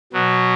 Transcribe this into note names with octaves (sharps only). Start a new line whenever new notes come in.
B2 F#3 B3